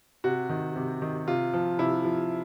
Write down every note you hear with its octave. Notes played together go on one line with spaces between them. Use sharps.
C3 F#4
D#3
C3
D#3
C3 F4
F3
C3 E4
F3